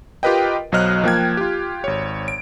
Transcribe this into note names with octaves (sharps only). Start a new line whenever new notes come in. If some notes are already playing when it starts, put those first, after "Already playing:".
F4 G4 A#4 B4 D#5 G5
B1 F#3 C5 D#5 F6 F#6
F3 A#3 G5 G#6
F4 G4
G#1 C#5
D7